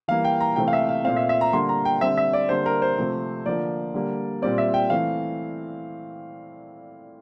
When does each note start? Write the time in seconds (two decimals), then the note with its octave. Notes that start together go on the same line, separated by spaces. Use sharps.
0.08 E3 G3 A#3 F5
0.24 G5
0.41 A#5
0.56 C3 E3 A3 C4 G5
0.68 F5
0.73 E5
0.89 F5
1.04 A#2 A3 C4 F5
1.17 E5
1.29 E5
1.41 A#5
1.53 D3 G3 A#3 C6
1.69 A#5
1.85 G5
2.01 D3 G3 C4 E5
2.18 E5
2.33 D5
2.49 D3 G3 A#3 C5
2.66 A#4
2.82 C5
2.98 C3 F3 A3 C4
3.46 D3 F3 A#3 D5
3.94 D3 G3 A#3
4.42 A#2 G3 C4 D5
4.58 E5
4.74 G5
4.90 E3 A3 C4 F5